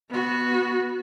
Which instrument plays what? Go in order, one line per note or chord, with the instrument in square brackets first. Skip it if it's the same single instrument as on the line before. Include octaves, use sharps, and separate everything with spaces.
[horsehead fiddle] B3 F#4